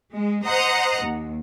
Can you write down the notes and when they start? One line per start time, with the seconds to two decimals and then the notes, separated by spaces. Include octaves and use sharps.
0.13 G#3
0.45 C5 D#5 F#5 A#5 D#6
1.03 D#2